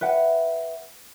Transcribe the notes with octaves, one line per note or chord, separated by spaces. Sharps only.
B4 E5 F#5 G5